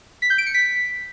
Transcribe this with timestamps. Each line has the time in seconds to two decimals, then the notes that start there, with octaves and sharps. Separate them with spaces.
0.22 B6
0.30 G6
0.38 D7
0.46 C#7
0.54 B6